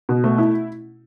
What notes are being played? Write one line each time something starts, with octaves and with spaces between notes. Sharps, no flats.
B2
A3
E4